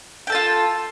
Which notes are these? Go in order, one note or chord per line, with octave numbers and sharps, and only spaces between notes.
F4 A4 G5 A5